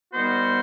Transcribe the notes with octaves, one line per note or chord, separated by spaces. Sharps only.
D#3 G3 B3 F#4 C5